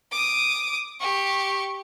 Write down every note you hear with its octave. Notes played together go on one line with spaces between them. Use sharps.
D6 D#6
G4 C#6